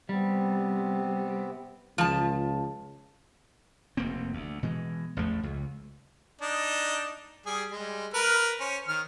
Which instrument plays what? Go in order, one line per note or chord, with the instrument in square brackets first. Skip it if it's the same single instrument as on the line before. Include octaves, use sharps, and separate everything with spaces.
[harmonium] C3 B3 C4 [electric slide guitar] G3
[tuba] C#2 [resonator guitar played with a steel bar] F3 A5
[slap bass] F1 D#2 A#3 C4
D2
B2 E3 G#3
A1 E2 F3 A3
C#2
[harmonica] D4 D#4
G3 G#4
G3 G#3
A#4 B4 F6
C#4 C5
D#3 F6